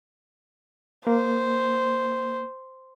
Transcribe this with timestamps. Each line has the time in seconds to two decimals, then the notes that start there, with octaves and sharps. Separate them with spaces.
1.07 A#3 C5